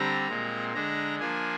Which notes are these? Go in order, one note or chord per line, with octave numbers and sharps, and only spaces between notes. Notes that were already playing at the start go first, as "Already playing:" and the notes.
Already playing: D3 G3 C4 A#5
A#2 G#3 C4
D3 G#3 D4 A#5
F3 A#3 D4 G#5